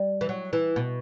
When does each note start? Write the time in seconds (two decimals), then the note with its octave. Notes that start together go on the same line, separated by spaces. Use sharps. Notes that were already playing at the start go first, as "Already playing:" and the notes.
Already playing: G3
0.21 E3
0.29 F#3
0.53 E3
0.76 B2